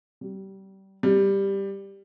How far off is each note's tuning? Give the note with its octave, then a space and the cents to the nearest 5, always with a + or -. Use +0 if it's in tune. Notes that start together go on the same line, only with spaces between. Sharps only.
G3 -25
G3 +5